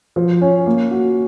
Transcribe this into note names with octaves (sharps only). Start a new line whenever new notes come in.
F3
C#4
A#3
F#4